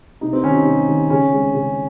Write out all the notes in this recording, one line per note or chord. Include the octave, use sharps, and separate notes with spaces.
C3 D#4
C4
D#3 G3 C#4
D#4
C3
D#3 G3
C#3 C#4
G#3 C4
C#3